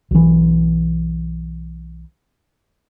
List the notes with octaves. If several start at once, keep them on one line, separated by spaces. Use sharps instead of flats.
B1 E3